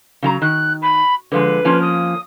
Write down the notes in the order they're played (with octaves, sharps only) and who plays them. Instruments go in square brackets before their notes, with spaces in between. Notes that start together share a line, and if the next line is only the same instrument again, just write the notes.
[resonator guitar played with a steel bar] C#3 F#3 A#5
[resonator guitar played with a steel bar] D#3 [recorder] F#6
[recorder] B5
[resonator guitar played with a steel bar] D3 F3 G#3 [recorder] B4
[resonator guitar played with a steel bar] F3 A#3 C#4
[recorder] D#6